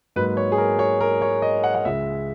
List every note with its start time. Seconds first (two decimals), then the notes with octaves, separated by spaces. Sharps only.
0.16 G#2 F#3 A#3 B4
0.37 C#5
0.52 G#4
0.58 A#4
0.79 C#5
1.01 A#4
1.22 C#5
1.42 D#5
1.64 F#5
1.75 F#5
1.85 C#2 C#3 G#3 E5